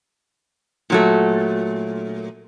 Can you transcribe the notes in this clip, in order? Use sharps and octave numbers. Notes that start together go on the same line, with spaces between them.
A#2 F#3 A3